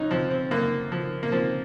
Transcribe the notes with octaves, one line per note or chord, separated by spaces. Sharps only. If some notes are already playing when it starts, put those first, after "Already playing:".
Already playing: F#2 C#4 D#4
F3 C4
C4
F#2 A#3
F3
A#3
F3 C4